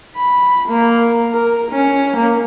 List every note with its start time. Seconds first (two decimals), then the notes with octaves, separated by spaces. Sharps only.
0.16 B5
0.68 A#3
1.32 A#4
1.71 C#4
2.16 A#3